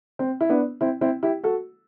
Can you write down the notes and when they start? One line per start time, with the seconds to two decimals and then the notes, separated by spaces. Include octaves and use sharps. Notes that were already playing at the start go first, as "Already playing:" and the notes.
0.19 C4
0.41 E4
0.49 B3 D4
0.81 C4 E4
1.01 C4 E4
1.23 E4 G4
1.44 F#4 A4